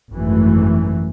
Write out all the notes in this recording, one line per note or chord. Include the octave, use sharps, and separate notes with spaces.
G#1 F#2 E3 A3